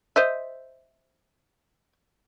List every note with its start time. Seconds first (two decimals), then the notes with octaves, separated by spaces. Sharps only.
0.16 C5 D#5 E5